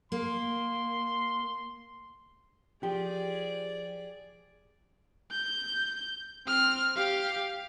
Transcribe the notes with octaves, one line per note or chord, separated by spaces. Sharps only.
A#3 C6
F3 G4 G#4 D5
G6
C4 F6
G4 F5